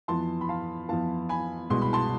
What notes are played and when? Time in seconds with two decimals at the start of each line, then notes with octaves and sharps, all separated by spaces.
0.08 F2 E3 B3 A5 C6
0.41 B5
0.49 F5 A5
0.89 F2 E3 B3 F5 A5
1.29 G#5 B5
1.70 C2 B2 G#3 C6
1.81 B5
1.93 A5 C6